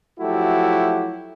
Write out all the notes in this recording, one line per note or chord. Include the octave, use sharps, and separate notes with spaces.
F3 F#3 A3 E4 F#4 G4